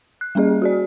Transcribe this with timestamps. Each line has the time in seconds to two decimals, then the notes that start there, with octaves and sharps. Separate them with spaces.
0.21 F#6
0.35 G3 A#3 C#4 G#4 D#5
0.62 F#4 G#4 D5